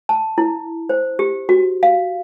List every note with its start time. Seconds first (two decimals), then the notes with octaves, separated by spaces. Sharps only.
0.09 A5
0.38 E4
0.89 C5
1.19 G4
1.49 F#4
1.83 F5